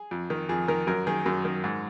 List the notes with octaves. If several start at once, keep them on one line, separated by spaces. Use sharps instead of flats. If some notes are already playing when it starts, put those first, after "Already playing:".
Already playing: G#4
F2
D#3
F2 G#4
D#3 A#4
F#2 A#4
D#3 G#4
F#2
D#3
G#2